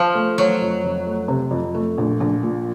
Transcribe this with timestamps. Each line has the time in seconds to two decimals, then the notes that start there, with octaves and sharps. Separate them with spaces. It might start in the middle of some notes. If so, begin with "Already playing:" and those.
Already playing: F3
0.15 A3
0.38 F#3 A3
0.61 F2
0.84 F2
1.06 A3
1.28 C3
1.51 F2
1.75 A3
1.98 A#1
2.20 A#1
2.43 A#2